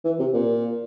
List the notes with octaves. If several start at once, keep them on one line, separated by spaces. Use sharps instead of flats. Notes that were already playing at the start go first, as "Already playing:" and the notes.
E3
C3
A#2